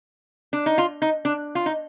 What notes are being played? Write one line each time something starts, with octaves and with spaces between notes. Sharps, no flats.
D4
D#4
F4
D#4
D4
F4
D#4